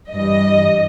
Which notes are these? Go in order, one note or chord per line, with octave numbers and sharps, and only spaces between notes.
G2 E3 G3 D#5